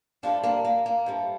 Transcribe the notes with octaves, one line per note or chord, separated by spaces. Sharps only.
G2 F3 A3 D4 F4
A#3 D4
A#3
A#3
G2 F3 A3